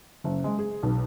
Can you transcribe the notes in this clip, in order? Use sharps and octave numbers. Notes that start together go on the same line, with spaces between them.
F#1
G#3
G#4
B1